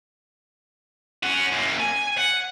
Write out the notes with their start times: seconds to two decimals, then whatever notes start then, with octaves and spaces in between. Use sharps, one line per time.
1.23 C#4 F#4
1.52 F#2 A#3
1.80 G#5
2.18 F#5